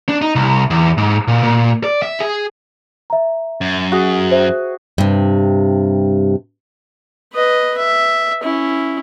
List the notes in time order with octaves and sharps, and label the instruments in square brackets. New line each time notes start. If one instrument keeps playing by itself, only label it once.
[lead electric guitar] D4
D#4
C2
E2
G#2
A#2
A#2
D5
E5
G#4
[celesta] E5 A#5
[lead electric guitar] F#2
[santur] F#4 G#4
[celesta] C5 E5
[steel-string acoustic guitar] G2 C3
[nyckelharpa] B4 D#5
E5
C#4 E4